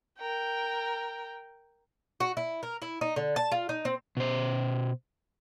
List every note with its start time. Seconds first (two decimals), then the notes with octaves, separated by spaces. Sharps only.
0.19 A#4 G5
2.20 F#4
2.37 E4
2.63 A#4
2.82 E4
3.01 D#4
3.16 D3
3.36 A5
3.52 F4
3.69 D#4
3.85 C4
4.17 B2 C5